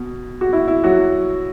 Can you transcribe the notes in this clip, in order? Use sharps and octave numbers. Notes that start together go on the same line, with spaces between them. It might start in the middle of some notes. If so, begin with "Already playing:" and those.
Already playing: B2
F#4
E4
E4
F#3 F#4